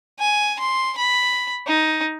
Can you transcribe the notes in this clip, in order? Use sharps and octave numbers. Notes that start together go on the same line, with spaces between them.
G#5
C6
B5
D#4